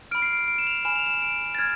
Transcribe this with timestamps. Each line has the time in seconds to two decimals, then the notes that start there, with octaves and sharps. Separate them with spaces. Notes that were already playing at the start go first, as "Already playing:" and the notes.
0.11 B5 F6 D7
0.22 C7
0.33 D7
0.48 D7
0.58 E7
0.67 F7
0.85 G#5 B5 F6 E7
0.96 F7
1.06 E7
1.22 D7
1.55 A6
1.59 F6 G#6